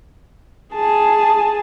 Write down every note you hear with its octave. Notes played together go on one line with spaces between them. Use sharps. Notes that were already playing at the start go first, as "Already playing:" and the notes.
G#4 A5